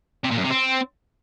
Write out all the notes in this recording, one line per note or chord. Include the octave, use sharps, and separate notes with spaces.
C3
A#2
F#2
C3
C4